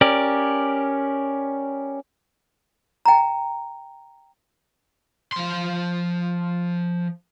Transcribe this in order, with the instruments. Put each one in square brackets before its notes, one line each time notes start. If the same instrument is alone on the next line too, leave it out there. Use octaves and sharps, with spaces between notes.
[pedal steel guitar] C#4 G4 A#4 D5
[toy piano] G5 A#5
[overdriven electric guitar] F3 C6